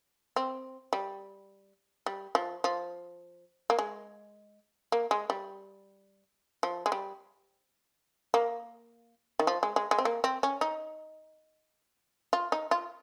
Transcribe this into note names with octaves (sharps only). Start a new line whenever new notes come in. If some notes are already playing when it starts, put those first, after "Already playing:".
C4
G3
G3
F3
F3
A#3
G#3
A#3
G#3
G3
F3
G#3
G3
A#3
D#3
F3
G#3
G#3
G#3
C4
A#3
C4
C#4
D#4
F4
D#4
F4